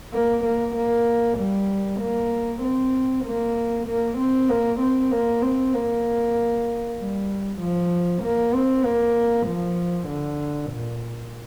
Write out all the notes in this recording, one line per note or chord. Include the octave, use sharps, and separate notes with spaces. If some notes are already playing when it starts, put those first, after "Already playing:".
A#3
A#3
A#3
G3
A#3
C4
A#3
A#3
C4
A#3
C4
A#3
C4
A#3
G3
F3
A#3
C4
A#3
F3
D3
A#2